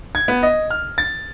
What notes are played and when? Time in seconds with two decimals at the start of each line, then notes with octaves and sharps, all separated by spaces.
0.15 G#6
0.28 B3
0.43 D#5
0.70 F6
0.98 A6